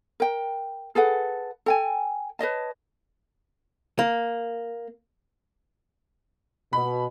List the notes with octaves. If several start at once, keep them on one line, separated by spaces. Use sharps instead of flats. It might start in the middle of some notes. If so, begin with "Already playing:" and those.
A#4 G5
G#4 A4 B4 F#5
A4 G5 G#5
B4 C#5 D#5 A5
A#3
B2 B5